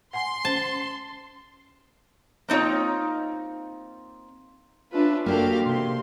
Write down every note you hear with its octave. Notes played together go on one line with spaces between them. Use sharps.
F#5 G#5 C6
C#4 C5 A5
A#3 C4 D#4 F4 C#5
C#4 D4 F4 B4 E5
D3 A#3 D4 F#4 G4 A4 F5
C3 C6